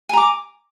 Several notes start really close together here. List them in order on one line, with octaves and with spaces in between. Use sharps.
G#5 A#5 D6